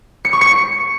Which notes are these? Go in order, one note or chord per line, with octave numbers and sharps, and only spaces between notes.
C#7
C#6
C#7